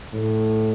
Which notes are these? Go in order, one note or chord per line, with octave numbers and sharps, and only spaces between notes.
A2